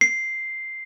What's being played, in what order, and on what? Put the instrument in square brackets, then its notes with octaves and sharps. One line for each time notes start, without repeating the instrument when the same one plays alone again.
[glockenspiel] C7